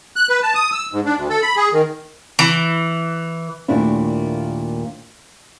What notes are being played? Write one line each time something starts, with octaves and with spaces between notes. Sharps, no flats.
F#6
B4
A5
D#6
E6
G#2
D4
D2
A4
B5
G#4
D#3
E3
D#2 A#2 A3 D4 E4